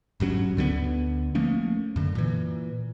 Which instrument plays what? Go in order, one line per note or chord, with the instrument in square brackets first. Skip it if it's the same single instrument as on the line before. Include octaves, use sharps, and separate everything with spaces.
[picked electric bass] G#1 G2 F#3 C#4
D2 D3 F#3 B3
F3 A3 A#3 C#4
F#2 D3
A#2 E3